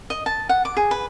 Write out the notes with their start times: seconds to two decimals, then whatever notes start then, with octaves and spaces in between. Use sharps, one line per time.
0.10 D#5
0.26 A5
0.49 F#5
0.65 D6
0.77 G#4
0.91 B4